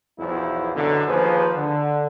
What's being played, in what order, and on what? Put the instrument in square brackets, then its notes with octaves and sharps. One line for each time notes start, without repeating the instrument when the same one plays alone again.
[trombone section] B1 E2 F3 E4
F#2 B2 D3
D#2 F3 G#4 B4 C5
D3